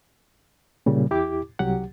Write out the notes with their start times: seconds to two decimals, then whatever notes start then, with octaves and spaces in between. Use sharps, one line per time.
0.86 A#2 C#3 G3
1.11 E2 E4 G4 D6
1.59 C2 F#3 G4 F#5